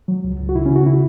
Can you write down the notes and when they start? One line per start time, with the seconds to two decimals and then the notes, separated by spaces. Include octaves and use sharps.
0.08 F#3
0.24 C#2
0.40 C#2
0.49 F#4
0.55 C#3 E4
0.66 C#4
0.70 C#3
0.76 F#4
0.86 C#3 E4